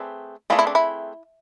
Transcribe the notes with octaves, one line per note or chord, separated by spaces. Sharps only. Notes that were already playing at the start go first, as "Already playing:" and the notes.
Already playing: A3 C4 G#4 B4 D5
A3 C4 F4 G#4 B4 D5
E4
D4
E4